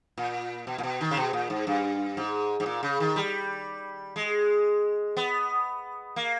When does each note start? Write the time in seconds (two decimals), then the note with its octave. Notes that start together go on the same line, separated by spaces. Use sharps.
0.18 A#2
0.67 B2
0.78 A#2
0.83 B2
1.01 D#3
1.11 C#3
1.17 B2
1.33 A#2
1.50 G#2
1.67 G2
2.17 G#2
2.60 G#2
2.66 A#2
2.83 C#3
3.00 D#3
3.16 G3
4.16 G#3
5.17 B3
6.16 A#3